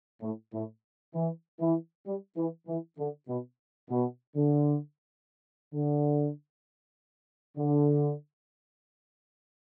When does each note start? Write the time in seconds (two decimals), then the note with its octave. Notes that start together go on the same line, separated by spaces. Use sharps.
0.22 A2
0.53 A2
1.14 E3
1.60 E3
2.06 G3
2.37 E3
2.68 E3
2.98 D3
3.28 B2
3.90 B2
4.35 D3
5.74 D3
7.57 D3